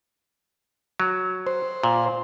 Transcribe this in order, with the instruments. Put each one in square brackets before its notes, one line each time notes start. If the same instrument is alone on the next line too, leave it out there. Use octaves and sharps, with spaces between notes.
[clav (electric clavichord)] F#3
[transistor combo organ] C5
[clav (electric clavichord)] A#2